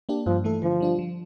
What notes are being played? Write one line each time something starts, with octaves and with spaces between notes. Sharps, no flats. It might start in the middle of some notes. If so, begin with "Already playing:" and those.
A#3 D4 G4
G2 F3
E3 A3 E4 A4
D3 F3
G3 D4 F4
F3